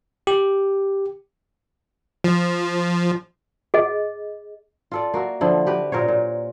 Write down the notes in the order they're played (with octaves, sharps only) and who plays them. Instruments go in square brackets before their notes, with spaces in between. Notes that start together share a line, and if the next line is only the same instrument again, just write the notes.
[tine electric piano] G4
[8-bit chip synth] F3
[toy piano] G#4 D#5
[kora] F4 A4 D5
A#3 F#4 E5
D3 F3 E4
F#4 G4 B4
A#2 A#4 C5 C#5
A#2